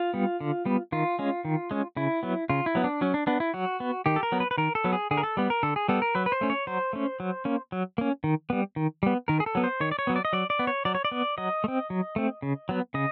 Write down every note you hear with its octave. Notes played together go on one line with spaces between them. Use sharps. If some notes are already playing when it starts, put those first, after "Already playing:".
Already playing: F4
G3 B3
D3
G3 B3
D#3 F4
G#3 C#4
D#3
G#3 C#4
C#3 E4
F#3 B3
C#3 F4
E4
F#3 B3
D4
F#3 C#4
D4
B3 D4
E4
F#3 F#4
B3
D#3 G4
A4
A#4
F#3 B3
B4
B4
D#3 A#4
A4
F#3 B3
G#4
D3 G#4
A#4
A4
G3 B3
A#4
D3 A4
G#4
G3 B3 A4
A#4
F#3 B4
B4
C5
A3 C#4
C#5
F#3 C5
A3 C#4
F#3
A#3 C#4
F#3
A#3 C#4
D#3
G3 B3
D#3
G3 B3
D#3 A#4
G#4
A4
F#3 B3
C5
D#3 C#5
D5
C#5
F#3 B3
D5
D#5
F#3 D5
D5
B3
C#5
F#3 D5
C#5
D5
B3
F#3 D#5
A3
C4
F#3
A3 C4
C#3
F#3 B3
C#3 D#5